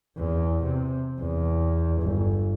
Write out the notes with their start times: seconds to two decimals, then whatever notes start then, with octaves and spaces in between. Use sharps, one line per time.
0.17 E2
0.63 C3
1.19 E2
2.02 G1